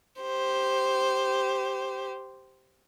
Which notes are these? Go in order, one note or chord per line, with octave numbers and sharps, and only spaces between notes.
G4 C5